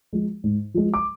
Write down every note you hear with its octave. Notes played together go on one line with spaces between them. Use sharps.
F3 G#3
G#2
F3 G#3
D6